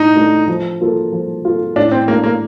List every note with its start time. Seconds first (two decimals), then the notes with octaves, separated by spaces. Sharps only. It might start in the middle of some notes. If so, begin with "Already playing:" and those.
Already playing: A2 D4 D#4
0.15 A3 D4
0.48 F3
0.80 A#3 F4 A4
1.12 F3
1.44 A#3 F4 A4
1.76 A2 D4
1.92 C4
2.08 A3 A#3 D4
2.24 A#3